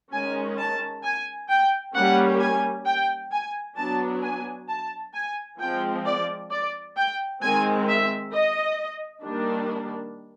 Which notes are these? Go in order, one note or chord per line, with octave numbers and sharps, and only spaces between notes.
D#3 G#3 C#4 G#5
A5
G#5
G5
G3 A#3 C#4 F#5
G#5
G5
G#5
F#3 B3 D4 A5
G#5
A5
G#5
F3 G#3 C4 G5
D5
D5
G5
D#3 G#3 C4 G#5
E5
D#5
D#3 G3 A#3 D4